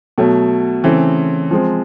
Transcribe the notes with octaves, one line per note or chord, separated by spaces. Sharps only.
B2 F#3 A3
C#3 E3 A3 C4
F3 G#3 C4